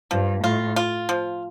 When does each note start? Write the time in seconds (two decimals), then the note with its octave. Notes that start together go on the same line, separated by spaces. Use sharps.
0.11 G2 F3
0.44 A2 F4
0.76 F4
1.09 F3